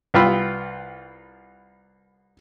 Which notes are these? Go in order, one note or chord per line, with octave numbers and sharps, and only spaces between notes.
C2 B3 F4 G5 B5 E6